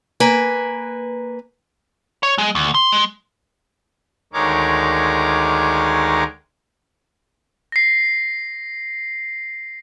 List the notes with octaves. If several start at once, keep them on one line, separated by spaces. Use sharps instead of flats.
A#3 B4 G#5
C#5
G#3
D2
C6
G#3
D2 D#3 G#3 A#4 C#5 D6
A#6 C7